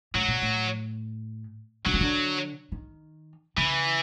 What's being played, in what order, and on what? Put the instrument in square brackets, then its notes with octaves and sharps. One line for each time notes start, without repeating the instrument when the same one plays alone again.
[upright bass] A2 [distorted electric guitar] F#3
[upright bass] A#2
A2
[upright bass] D3 [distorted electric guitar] F#3
[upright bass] D#3
D3
D#3
[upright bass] C#3 [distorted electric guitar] E3